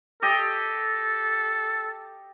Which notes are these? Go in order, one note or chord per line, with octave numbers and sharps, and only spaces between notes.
G4 A4 D#5